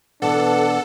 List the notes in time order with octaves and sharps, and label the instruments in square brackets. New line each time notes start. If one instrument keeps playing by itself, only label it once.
[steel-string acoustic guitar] B2 E3 [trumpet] D4 [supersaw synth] A4 [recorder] F#5